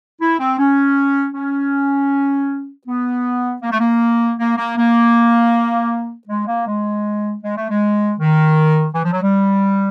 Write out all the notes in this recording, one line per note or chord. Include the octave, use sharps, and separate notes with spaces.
E4
C4
C#4
C#4
B3
A#3
A3
A#3
A#3
A#3
A#3
G#3
A#3
G#3
G#3
A3
G#3
D#3
E3
F3
F#3
G3